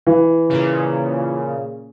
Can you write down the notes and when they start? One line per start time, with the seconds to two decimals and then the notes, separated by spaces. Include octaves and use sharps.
0.07 E3
0.49 A#2 C#3